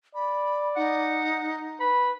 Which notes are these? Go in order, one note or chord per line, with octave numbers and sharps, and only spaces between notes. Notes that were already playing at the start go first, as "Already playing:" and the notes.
D5 B5
D#4 F#5
B4 B5